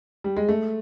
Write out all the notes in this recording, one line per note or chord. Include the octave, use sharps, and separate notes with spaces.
G3
G#3
A3